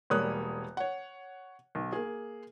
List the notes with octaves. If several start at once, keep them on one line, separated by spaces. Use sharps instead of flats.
E1 G3 A#3 C#5 D#6 F#6
C#5 F#5
B1
A#3 G#4